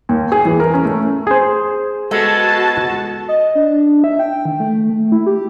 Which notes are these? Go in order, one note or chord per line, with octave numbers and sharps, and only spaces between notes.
D#2
G#4
E3
A#4
C#4
A3
G#4 C5
G#3 B3 F#4 A4 A5
D#5
D4
E5
G5
D#3
A3
A3
E4
G4